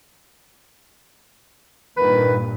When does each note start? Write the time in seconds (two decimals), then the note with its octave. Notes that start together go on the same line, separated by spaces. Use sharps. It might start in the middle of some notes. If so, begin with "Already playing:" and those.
1.97 G2 A#2 D#3 A#3 B4